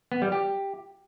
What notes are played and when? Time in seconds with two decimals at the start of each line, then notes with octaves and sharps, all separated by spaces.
0.12 B3
0.22 G3
0.32 G4